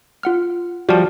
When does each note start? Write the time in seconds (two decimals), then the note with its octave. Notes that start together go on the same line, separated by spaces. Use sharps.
0.23 F4 F#5 F6
0.89 F3 G3 F#4 D5 A5